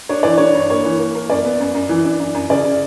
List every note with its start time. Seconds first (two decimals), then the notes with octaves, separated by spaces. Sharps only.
0.09 D4 C#5
0.23 E3 D5
0.38 D4 C#5
0.55 G2
0.70 A#3 C#5
0.85 E3
0.99 A#3
1.15 A#3
1.30 F#2 D5
1.45 B3
1.60 F#2
1.74 F#2
1.89 E3
2.05 D4
2.19 F#2
2.34 F#2
2.50 C#3 D5
2.65 C#3